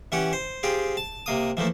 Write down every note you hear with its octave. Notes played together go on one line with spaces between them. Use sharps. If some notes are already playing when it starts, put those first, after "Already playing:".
E3 C#4 G4 F#5
C5
C4 F4 G4 G#4
A5
C3 A#3 D#6
E3 F3 A3 A#3